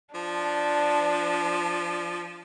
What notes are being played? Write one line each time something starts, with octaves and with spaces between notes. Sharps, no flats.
F3 D4